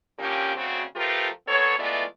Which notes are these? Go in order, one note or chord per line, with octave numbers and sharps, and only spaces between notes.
D3 F3 A#3 C#4 G4
D2 C#3 C4 F#4
F3 A3 F4 G4 A#4 B4
A#2 B3 A4 C#5
E3 G#3 A3 B3 F4 D5